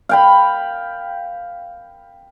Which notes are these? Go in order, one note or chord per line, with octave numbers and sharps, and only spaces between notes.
F5 G5 B5